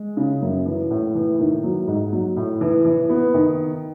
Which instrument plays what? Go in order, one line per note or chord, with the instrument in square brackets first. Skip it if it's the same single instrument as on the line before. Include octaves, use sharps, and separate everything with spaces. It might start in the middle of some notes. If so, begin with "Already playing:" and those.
Already playing: [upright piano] G#3
C#3
F#2
E3
A2
E3
D#3
F#3
G#2
F#3
A2
E3
E3
B3
D#3